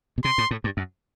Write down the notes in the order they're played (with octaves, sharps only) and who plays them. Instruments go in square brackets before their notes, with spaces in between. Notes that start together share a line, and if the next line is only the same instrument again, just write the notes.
[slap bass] B2
[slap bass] C3 [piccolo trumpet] C6
[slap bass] A2
A2
G2
F#2